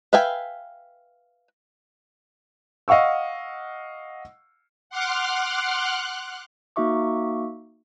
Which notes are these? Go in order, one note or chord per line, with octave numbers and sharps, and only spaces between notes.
B4 E5 F5 G5 G#5
D#5 F5 F#5 C#6 E6
F#5 C6 D6 F6 F#6
A#3 D#4 F#4 E5 C#6 D6